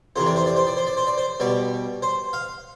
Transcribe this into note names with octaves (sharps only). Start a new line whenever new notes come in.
F2 C3 E3 C5
D5
C5
D5
C5
D5
C5
D5
C5
D5
C5
B2 G3 D5
C5
F5